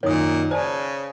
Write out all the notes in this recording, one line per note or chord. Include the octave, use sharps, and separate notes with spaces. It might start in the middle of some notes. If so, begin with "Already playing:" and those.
F#2 A#2 D#3 C#5 D#6
C#3 C5 D5 G#5 A5